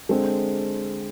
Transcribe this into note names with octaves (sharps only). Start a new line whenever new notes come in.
D3 G#3 C4